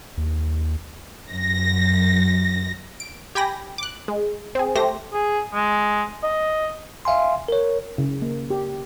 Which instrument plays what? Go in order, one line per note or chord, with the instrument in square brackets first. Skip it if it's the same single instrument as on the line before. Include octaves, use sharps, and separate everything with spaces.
[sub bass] D#2
[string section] F#2 A#6
[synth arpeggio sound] D7
G4 G5 G#5 B5 A#6
D6 F#6
G#3
C4 G#4
A3 G4 C5 A#6
[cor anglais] G#4
G#3
D#5
[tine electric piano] E5 F5 G#5 C6
A#4 C#5
[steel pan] C#3
A#3
G4